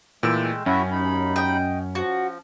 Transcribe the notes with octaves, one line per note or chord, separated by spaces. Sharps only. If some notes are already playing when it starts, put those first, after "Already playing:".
A#2 E3 G#3 A3 G5 E6
F#2 C#4 E4 F#4 E5
D#2 D#4 B5
D#5 G5
F3 F#4